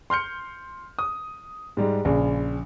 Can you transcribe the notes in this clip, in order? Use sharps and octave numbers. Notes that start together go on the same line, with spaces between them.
C6 F6 G6 C#7
D#6
G#2 G3 G#3
A#1 C#3